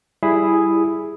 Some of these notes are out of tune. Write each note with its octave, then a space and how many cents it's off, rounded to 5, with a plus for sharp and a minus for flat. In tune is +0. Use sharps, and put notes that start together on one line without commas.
G3 +0 E4 +0 G#4 +0